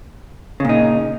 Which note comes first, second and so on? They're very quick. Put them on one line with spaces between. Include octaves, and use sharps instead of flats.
C#3 A#2 D#4